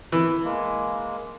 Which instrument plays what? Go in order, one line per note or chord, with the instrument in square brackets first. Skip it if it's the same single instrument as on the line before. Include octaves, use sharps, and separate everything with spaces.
[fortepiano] E3
[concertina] G#3 A#3